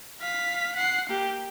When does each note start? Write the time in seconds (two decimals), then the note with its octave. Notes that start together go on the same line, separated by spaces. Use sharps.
0.21 F5 B6
0.76 F#5 C7
1.09 A#3 G4